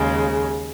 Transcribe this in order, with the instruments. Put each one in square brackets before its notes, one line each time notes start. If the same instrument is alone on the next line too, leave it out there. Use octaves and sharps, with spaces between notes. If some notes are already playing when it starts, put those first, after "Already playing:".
Already playing: [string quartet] D#2 C#3 G#3